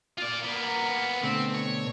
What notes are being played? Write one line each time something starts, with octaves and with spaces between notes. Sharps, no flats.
F4 D5
A#3 B3
A#5
B4
B2 D3 A3 C4
C#5